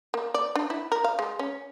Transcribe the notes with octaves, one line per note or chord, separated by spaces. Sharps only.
A#3
D5
D4
E4
A#4
F5
G#3
C#4